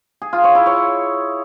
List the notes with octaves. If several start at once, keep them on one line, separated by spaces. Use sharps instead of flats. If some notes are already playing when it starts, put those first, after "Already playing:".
G#4
F4
C#5
E4
C#5